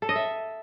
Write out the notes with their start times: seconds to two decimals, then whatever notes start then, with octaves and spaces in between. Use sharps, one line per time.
0.02 A4
0.09 D#5
0.16 E5